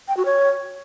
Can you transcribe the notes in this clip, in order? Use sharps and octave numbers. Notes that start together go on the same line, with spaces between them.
G5
F#4
C#5